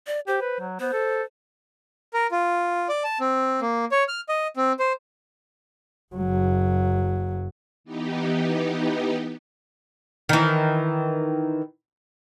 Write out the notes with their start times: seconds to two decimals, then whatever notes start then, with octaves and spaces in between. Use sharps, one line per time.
0.07 D5
0.27 G4 C5
0.41 B4
0.59 F#3
0.80 B3 C5
0.93 A4
2.14 A#4
2.31 F4
2.89 D5
3.04 A5
3.20 C4
3.61 A#3
3.92 C#5
4.08 F6
4.29 D#5
4.57 C4
4.79 C5
6.15 F#1 F#3
7.84 E3 B3 D#4 G4
10.29 D#3 E3